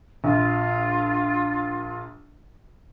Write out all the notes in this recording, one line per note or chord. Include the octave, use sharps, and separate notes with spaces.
A#1 F4